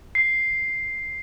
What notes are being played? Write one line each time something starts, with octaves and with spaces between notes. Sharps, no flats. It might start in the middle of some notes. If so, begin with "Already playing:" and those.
C7